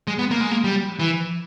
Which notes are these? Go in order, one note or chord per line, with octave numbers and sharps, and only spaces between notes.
G#3
B3
A#3
G#3
A#3
G3
E3